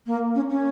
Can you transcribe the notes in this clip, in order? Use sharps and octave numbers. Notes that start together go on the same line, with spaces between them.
A#3
C#4
C#4